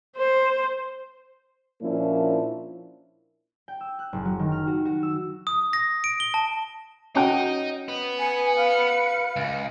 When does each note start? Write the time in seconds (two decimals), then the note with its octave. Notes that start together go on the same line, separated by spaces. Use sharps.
0.16 C5
1.82 A#2 F3 A#3 C#4 D4 E4
3.68 G5
3.81 E6
3.99 F#6
4.13 F#1
4.25 F#3
4.39 D#3
4.52 F6
4.67 F#4
4.85 F#4
5.03 E6
5.47 D#6
5.73 A#6
6.04 D7
6.20 G7
6.34 A5
7.15 C#4 D#4 F#4 G5
7.89 B3
8.19 B4 G#5 C#7
8.56 F5
9.36 C#2